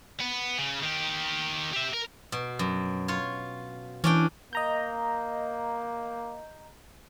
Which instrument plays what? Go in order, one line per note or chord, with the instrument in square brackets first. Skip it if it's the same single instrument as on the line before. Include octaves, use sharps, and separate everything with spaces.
[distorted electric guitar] B3
C#3
D#3 G4
G4 E5
A#4
[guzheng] B2
F#2
F4 C#5
[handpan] E3 [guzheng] C#4 D4 G5
[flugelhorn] A#3 [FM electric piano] D#5 A#5 G6